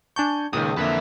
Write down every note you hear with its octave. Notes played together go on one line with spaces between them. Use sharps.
D4 G#5 A5 C#6 G6
C#2 A#2 D#3 D#6
F2 D3 A#3 B4 E5